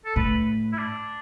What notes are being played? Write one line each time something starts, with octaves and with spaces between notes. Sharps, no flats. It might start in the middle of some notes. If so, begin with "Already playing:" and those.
A4
A2 B4
E4
D4